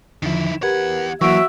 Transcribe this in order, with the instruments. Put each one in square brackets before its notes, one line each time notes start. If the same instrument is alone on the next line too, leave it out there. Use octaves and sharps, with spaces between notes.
[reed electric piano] E2 D3 F3 [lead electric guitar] D#3 E4
[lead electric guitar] E2 F#5 [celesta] G4 G#6 [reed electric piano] A#4 B4
[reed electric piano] E3 A#3 [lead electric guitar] F#3 [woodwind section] F#4 E5 [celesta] C#6 D7